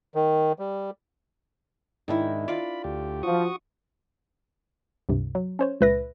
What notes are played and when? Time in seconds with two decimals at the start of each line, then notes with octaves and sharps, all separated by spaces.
0.15 D#3
0.59 G3
2.08 G#2 D#3 D4 E4
2.48 F4 D5 B5
2.84 D2 G4
3.23 F3 F#4 C#6 D#6
5.09 C#2 G2 C3
5.35 F#3
5.59 C#4 C5 C#5
5.81 C#2 A#2 B4 E5 A#6